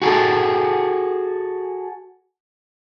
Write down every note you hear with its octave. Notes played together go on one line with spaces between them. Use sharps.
F#4 G#4 A4